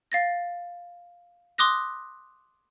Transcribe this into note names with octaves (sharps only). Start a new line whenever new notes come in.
F5 A6 A#6
C6 D6 D#6 F#6 A#6